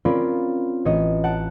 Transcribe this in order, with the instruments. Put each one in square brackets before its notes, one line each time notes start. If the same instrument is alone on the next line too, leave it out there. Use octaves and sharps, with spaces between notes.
[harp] C4 C#4 F4 A#4 D5 B5
A1 C#5 D#5
F#5 A5 D7